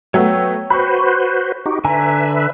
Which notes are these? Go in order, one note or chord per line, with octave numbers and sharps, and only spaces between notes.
F#3 A3 B3 C#5 G5 E6
F#4 B4 C5 B5 C#6
D#4 F#4 G4
D3 B4 E5 G#5 A#5